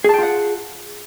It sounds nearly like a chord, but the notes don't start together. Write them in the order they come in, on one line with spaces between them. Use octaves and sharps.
G#4 A5 G5 F4 F#5